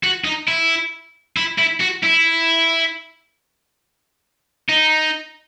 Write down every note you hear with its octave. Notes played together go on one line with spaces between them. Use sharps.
F#4
D#4
E4
E4
E4
F#4
E4
D#4